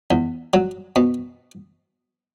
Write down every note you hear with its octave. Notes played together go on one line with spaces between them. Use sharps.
E2
F#3
B2